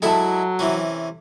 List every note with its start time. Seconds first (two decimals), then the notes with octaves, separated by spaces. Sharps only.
0.02 F#3 G#3 E4 A4 E5 A5
0.59 C3 E3 C#4